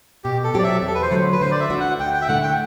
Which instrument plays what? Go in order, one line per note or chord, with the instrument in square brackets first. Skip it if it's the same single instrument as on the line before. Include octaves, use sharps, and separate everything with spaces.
[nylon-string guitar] B2 [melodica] G4
[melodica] A4
[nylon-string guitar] F#3 C4 G4 [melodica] D5
[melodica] E5
[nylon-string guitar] E2
[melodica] A4
B4
C5
[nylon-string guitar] D3 F#3 A3
[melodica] B4
[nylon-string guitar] D3 [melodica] C5
[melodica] D5
E5
[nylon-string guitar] A3 D4 F#4
[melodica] F#5
[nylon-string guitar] D2 [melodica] G5
[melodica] G5
E5
[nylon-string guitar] D3 A3 E4 [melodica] F#5
[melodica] G5